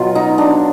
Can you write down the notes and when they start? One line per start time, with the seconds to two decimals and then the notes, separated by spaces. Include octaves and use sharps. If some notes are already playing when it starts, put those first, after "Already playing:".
Already playing: B2 F#3 F4
0.15 D#4
0.38 D4